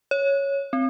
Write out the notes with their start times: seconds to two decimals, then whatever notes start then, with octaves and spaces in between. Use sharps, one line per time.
0.11 C#5
0.73 C4